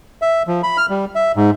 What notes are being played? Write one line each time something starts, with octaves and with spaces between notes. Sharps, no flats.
E5
F3
B5
F6
G3
E5
G#2